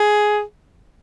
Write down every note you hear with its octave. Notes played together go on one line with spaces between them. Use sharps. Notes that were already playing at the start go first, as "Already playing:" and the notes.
Already playing: G#4